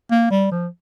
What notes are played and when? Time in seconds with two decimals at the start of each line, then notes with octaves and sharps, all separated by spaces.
0.11 A#3
0.30 G3
0.51 F3